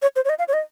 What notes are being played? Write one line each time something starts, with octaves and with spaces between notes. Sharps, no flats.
C#5
C5
C#5
D#5
F5
C#5
D#5